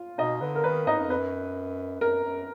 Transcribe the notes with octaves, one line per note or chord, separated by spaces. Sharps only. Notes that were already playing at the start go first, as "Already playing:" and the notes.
Already playing: F4 F5
B2 D#4 D#5
D3 B4
A#4
D#3 B4
G#2 D#4 D#5
F#2
F2 B4
F#2
F#2 A#4
F#2